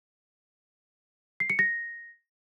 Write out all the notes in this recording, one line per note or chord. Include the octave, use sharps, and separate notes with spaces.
C7
C#7
A#6